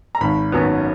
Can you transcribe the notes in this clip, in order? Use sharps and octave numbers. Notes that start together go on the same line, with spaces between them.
A#5
G#1 B5
F#2 D#3 F#3 B3